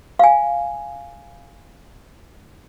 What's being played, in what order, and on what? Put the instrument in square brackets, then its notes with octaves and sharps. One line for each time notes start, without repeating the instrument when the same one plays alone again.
[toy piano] F5 G#5